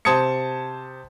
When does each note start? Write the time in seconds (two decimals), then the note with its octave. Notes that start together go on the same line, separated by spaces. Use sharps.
0.05 C3 C5 A5 D#6 G#6 C#7